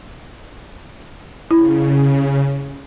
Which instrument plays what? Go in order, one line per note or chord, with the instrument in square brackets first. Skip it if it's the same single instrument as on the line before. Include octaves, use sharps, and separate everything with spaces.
[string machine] C#3 [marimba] E4